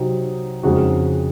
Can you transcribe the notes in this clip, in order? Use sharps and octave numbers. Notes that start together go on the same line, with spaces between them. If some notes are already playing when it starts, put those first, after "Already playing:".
Already playing: C3 F#3 C4 D#4 F#4
F2 C#3 G#3 D#4 F#4